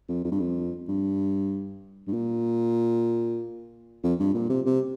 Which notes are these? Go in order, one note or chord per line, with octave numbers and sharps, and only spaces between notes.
F2
F2
G2
F2
G2
G2
A#2
F2
G2
A#2
C3
C3